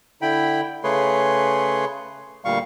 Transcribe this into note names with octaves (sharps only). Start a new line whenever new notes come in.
D3 E4 G5 B5
C#3 A3 G#4 B4 C#5 C6
D2 A#2 G3 F5 C#6